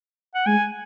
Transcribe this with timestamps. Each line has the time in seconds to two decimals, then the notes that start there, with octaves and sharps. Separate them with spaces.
0.35 F#5
0.46 G#3 G#5